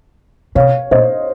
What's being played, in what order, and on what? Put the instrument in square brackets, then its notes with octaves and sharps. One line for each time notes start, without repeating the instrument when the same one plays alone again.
[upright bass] C3 [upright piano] C#5 F5
[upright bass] A#2 [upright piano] C5 D#5